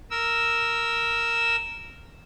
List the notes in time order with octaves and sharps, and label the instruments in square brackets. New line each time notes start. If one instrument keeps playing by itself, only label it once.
[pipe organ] A#4 E6